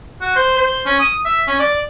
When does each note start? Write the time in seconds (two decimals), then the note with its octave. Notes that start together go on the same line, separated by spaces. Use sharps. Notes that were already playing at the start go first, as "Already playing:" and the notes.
0.21 F#4
0.36 C5
0.57 C5
0.86 C#4
0.99 D#6
1.25 E5
1.47 C#4
1.59 D5